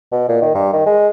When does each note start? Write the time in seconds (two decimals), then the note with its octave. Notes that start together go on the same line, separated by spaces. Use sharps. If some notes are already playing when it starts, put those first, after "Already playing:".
0.12 B2
0.29 A#2
0.42 D#3
0.54 G2
0.73 D#3
0.86 G#3